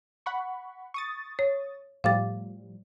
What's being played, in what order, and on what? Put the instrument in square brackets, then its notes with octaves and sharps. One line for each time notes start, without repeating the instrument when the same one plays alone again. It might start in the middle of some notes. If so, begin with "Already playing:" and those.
[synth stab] F#5 B5 C#6
C#6 D#6 A6
[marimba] C#5
[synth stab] A2 F3 G3 [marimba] F5 D6 A6